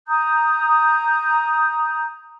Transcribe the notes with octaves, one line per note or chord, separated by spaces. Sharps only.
A#5 D#6 G6